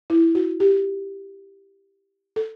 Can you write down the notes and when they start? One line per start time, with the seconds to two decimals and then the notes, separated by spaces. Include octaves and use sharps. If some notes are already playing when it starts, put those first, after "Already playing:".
0.10 E4
0.35 F#4
0.60 G4
2.36 A4